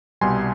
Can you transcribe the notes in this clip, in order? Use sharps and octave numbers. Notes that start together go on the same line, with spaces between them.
C2 B2 G3 G#5 C6